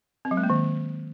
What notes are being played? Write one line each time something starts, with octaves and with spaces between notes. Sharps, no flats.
C4
F#3
G#3
A#3
D#3